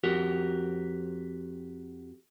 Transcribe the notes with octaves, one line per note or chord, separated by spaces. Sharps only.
F2 F#4 G4 A#4